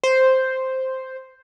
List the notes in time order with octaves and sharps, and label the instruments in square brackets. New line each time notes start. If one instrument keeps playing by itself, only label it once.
[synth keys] C5